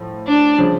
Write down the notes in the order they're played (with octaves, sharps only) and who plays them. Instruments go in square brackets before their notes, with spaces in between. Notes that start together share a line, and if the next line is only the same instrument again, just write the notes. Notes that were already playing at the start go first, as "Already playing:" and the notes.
Already playing: [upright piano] A2 F3
[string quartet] D4
[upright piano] C#3 F3